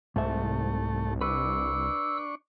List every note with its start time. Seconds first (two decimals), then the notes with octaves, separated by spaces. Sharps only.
0.16 C2 G#2 A3 E5
1.21 D4 B4 C#6 E6